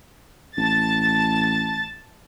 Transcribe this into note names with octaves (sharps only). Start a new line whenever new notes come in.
A1 A5 A6